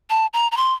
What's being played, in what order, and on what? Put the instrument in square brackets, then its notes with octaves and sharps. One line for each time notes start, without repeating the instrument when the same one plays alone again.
[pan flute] A5
A#5
A#5
C6